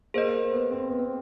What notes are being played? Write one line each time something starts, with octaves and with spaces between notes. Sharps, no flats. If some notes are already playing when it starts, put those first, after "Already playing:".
A#3 G#4 C5 D#5
B3
C4
B3
C4